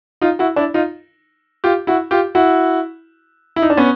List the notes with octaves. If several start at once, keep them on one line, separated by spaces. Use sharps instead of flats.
D#4 F4
E4 F#4
D4 E4
D#4 F4
F4 G4
E4 F#4
F4 G4
E4 F#4
E4
D#4
D4
B3 C#4